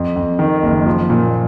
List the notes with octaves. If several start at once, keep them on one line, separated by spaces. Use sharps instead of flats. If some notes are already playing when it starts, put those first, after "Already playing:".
Already playing: F2
F2
D#3
F#1
F3
A#2